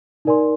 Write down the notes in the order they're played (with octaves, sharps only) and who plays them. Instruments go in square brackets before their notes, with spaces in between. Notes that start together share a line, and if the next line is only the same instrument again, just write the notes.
[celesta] D#4 A#4 D5 G#5 C6